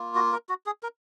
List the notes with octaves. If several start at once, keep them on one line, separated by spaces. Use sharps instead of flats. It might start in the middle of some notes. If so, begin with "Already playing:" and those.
Already playing: A#3 F4
F#4
A#4
F#4
G#4
A#4